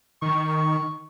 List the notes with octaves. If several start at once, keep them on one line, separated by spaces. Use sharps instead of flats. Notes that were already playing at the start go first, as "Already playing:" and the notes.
D#3 C#6